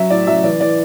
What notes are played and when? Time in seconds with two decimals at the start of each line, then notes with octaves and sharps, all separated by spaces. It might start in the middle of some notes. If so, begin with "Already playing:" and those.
Already playing: F#3 E5
0.10 A2 D5
0.27 F#3 E5
0.44 E3 D5
0.60 E3 D5